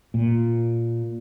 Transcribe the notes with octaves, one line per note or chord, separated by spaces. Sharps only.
A#2